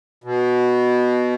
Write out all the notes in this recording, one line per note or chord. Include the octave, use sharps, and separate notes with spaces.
B2